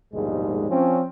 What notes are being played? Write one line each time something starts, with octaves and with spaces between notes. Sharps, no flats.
A#1 D#2 G#2 B2 G3 G#3
F3 C4 C#4